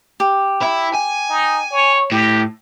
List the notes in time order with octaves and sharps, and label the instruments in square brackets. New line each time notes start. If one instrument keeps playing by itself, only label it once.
[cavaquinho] G4
[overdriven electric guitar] E4
G#5
[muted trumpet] D#4
C#5
[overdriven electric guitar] A2 [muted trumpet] G4